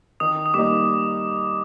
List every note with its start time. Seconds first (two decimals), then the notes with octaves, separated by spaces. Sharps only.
0.20 D#3 D#6
0.46 D#6
0.54 G3 A#3 D#4 D6